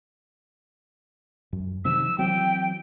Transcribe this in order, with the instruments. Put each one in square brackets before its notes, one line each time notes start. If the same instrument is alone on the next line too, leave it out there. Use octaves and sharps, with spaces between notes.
[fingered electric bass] F#2
[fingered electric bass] C3 D#3 F3 [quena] E6
[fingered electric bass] E3 F#3 C4 [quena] G5